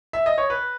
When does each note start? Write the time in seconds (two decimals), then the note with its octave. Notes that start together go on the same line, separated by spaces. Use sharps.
0.13 E5
0.26 D#5
0.38 C#5
0.50 B4